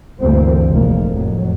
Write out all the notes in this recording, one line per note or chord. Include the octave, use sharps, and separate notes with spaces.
D2 G2 E3 G3 A#3 C4
F1 C2 A#2 G#3 A#3
F2 A2 F#3